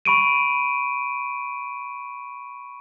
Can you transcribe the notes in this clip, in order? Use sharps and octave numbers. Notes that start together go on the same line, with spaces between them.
B5 C#6 D7 D#7